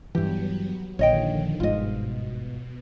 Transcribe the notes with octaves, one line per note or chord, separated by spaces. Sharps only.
G2 E3 F#3 B3 G4
A#1 D3 D#3 F3 C#5 D#5 G5
G1 G#2 B2 F4 D#5